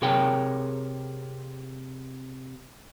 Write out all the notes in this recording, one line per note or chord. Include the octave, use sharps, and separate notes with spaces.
C3 G#4 A#4 C#5 G5